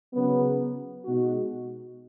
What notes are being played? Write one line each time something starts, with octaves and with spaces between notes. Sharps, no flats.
C#3 F#3 B3
B2 G#3 D#4 F#4